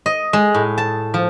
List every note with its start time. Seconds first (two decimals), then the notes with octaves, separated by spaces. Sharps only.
0.06 D#5
0.33 G#3
0.54 A2
0.78 A5
1.14 F3